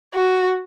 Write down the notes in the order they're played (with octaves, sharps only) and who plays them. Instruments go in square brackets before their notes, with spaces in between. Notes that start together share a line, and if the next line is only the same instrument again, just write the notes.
[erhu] F#4